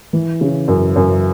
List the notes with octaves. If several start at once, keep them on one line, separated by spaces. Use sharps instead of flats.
E3
C#3
F#2
F#2